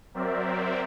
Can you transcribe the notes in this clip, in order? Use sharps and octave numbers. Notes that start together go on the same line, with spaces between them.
F#3 C4 A#4 C5 D5 E5